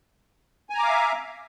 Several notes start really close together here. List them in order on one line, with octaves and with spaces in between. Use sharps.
G#5 A#5 D6 F5 E5